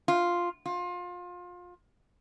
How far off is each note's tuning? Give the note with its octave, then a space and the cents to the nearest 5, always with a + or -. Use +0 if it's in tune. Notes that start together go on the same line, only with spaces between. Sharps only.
F4 +0
F4 +25